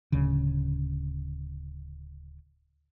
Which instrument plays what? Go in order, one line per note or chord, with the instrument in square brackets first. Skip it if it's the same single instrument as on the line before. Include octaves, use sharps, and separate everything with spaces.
[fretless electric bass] D1 D2 C#3